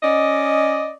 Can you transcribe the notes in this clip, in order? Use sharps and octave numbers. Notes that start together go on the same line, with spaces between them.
C#4 D5 D#5